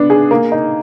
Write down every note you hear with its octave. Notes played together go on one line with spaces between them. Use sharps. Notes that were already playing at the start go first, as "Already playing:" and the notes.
Already playing: B3 D4
G#4
A#3
D#4